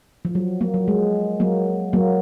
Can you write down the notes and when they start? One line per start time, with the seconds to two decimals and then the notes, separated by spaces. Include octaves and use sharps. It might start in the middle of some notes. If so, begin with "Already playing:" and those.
0.25 F3
0.35 F#3
0.61 F#3 A#3
0.74 F#3
0.88 G#3
1.40 F#3 A#3
1.93 F#3 A#3